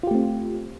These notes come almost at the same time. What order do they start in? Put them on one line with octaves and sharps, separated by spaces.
F4 G4 A3 C4